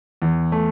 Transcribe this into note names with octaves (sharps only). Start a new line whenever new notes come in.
E2
A3